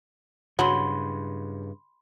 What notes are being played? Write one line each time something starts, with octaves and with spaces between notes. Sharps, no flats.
G2 C#3 F#3 B5 C6